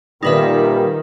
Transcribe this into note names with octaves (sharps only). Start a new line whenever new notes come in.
A#2 D#3 G3 D#4 B4 E5